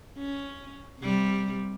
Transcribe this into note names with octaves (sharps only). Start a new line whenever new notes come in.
C#4
C3 G3